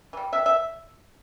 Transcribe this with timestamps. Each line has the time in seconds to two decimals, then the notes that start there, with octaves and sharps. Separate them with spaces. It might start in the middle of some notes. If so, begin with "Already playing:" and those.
0.13 E3
0.17 G3
0.33 C3 E5
0.46 E5